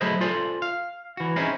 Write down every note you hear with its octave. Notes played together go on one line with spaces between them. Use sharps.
F#3 A3 E4 G#4 C5 D#5
F4 A4 C5 D5 G#5
F5
E3 F#4
C4 C#4 D#4 E4 G#4